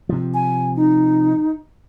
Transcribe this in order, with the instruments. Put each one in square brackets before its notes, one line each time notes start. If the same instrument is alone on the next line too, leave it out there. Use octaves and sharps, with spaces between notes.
[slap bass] C3 F3
[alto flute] G#5
D#4